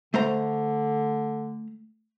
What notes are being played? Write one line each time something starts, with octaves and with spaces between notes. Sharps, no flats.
D3 A3 C5 A#5